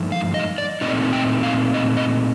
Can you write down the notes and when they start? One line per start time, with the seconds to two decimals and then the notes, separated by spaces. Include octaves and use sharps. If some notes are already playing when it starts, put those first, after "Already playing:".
Already playing: G2 F3 A3 D#4
0.12 F5
0.34 D#5
0.58 D5
0.81 A#2 A3 C4 D#4 D#5
1.13 G5
1.43 F5
1.74 D#5
1.97 D#5